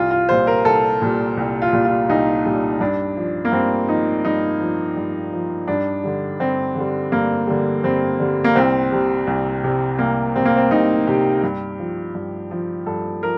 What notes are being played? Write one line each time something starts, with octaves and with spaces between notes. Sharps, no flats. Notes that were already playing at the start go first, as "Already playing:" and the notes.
Already playing: C2 F4
F4
A#2 G3 C5
A#4
C2 A4
A#2 G3
C2
F4
A#2 G3
F4
C2 D#4
A#2 G3
G2 D4
F3
A#3
G2 C4
F3 D#4
G2 D#4
F3
G2
F3
G2 D4
D3 G3
G2 C4
D3 G3
G2 A#3
D3 G3
G2 C4
D3 G3
A#3
C2 C4
C3 G3
C2
C3 G3
C2 A#3
C3 G3 C4
A#3
C4
C2 D#4
C3 G3 G4
G2
F3
G2
F3
G2 A4
F3 A#4